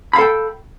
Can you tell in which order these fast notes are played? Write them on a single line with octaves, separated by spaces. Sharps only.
B5 F5 A4 G5